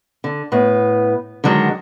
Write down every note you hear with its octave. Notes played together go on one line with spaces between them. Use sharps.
D3
A2 B3
D3 D#3 F#3 G#3